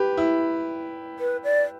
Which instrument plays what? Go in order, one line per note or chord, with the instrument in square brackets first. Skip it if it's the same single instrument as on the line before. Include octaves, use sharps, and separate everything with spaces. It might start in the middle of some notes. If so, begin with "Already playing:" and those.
Already playing: [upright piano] G4 B4
E4
[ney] B4
D5